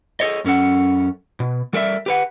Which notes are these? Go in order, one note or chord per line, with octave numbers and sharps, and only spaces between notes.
G#4 A4 C#5 D#5
F#2 C#4 A4 F#5
B2
G3 A4 A#4 D5 E5
G4 B4 F#5